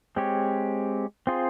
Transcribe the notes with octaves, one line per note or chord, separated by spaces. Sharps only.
G#3 C4 G4 C#5
C4 F4 G#4 C5